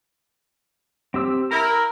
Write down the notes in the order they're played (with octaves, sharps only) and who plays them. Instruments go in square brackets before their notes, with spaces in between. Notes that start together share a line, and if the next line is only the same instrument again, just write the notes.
[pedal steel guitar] C4 G4 E6
[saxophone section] E4 A#4 [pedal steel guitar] A#5